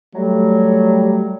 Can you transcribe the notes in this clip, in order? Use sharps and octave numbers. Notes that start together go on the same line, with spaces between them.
F#3 G3 A3